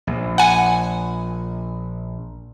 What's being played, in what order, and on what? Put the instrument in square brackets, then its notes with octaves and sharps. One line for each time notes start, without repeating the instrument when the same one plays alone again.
[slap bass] A#1
[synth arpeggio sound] F#5 G#5